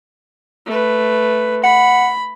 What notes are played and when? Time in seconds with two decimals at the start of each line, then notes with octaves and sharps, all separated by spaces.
0.66 A3 B4
1.64 F#5 B5